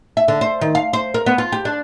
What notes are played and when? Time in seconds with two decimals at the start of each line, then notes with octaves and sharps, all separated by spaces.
0.17 E5
0.28 D3
0.41 C5
0.61 D#3
0.75 F5
0.93 C5
1.14 A#4
1.26 B3
1.38 F4
1.52 G4
1.65 D4